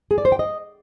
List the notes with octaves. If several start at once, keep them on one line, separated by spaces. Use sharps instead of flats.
G#4
D5
C5
G5
D#5